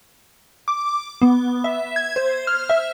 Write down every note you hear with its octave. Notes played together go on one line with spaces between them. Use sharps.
D6
B3
E5
G#6
C5
F6
E5